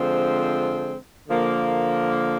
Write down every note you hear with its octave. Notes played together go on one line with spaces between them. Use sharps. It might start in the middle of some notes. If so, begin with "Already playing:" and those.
Already playing: D3 F3 G#3 C4
D3 F3 A#3